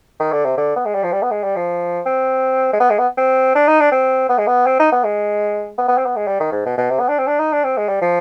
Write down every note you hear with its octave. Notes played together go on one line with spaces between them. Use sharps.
D#3
D3
C3
D3
B3
G#3
G3
F3
G3
B3
G#3
G3
F3
C4
G#3
B3
G#3
B3
C4
D4
D#4
D4
C4
B3
G#3
B3
C4
D#4
B3
G#3
B3
B3
C4
B3
G#3
G3
D#3
G#2
B2
B2
C3
B3
D4
C4
D4
D#4
D4
C4
G#3
G3
F3